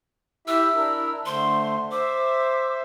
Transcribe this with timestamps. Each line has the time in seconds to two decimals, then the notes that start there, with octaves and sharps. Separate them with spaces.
0.47 E4 G4 E5 E6
0.75 D4 E4 A#4
1.26 D3 A3 C5 C6
1.91 C5 E5 D6